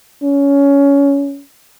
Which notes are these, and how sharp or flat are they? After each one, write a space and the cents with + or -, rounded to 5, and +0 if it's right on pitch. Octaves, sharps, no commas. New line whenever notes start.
C#4 +20